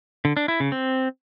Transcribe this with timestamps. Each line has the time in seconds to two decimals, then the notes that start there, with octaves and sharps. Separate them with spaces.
0.25 D3
0.37 D4
0.48 E4
0.60 C#3
0.72 C4